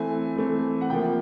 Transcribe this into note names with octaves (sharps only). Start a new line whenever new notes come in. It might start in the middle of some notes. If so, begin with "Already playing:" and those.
Already playing: E3 A3 C4 G#5
E3 A3 C4
F#5
C3 F3 A#3 G5